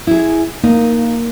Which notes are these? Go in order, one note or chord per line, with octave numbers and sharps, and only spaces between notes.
E4 G#4
A#3 D#4